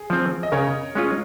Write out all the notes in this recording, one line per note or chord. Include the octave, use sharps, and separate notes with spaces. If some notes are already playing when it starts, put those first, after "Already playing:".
Already playing: G#4
F3 C4
D#5
C#3 A#4 C#5
G#3 C#4 F4